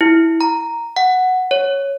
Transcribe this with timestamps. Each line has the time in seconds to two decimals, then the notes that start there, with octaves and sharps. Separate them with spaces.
0.01 E4
0.41 A#5
0.96 F#5
1.51 C#5